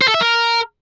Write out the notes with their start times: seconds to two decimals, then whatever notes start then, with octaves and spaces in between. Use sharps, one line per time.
0.01 C5
0.08 A4
0.14 E5
0.21 A#4